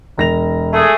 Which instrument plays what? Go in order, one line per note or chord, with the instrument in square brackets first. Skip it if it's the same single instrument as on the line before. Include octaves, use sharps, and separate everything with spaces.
[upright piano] E1 A#6 F7
[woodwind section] A3 G#4